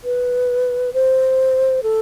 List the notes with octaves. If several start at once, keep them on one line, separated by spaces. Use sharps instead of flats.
B4
C5
A4